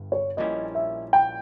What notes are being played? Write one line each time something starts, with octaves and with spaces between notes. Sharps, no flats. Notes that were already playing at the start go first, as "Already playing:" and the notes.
Already playing: G1 G2
C#5
A#1 A#2 G3 C#4 E4 D#5
E5
G5